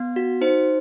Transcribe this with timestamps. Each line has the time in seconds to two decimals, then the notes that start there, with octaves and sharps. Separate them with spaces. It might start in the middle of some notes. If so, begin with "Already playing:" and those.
Already playing: B3
0.16 F#4
0.41 D#4 C5